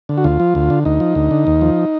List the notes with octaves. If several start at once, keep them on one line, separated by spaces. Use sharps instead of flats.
D3
F#4
D2 F4
F3
D2
D3
D2 D#4
F3
D2
D3
D#2
F3